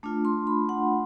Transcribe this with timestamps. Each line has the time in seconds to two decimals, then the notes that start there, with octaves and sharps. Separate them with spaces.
0.03 A3 D4 F4
0.25 C6
0.47 B5
0.69 F#5